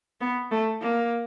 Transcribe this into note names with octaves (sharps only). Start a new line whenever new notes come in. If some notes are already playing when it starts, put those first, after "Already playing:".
B3
A3
A#3